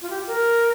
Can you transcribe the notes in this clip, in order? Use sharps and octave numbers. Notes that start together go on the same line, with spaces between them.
F4
G4
A#4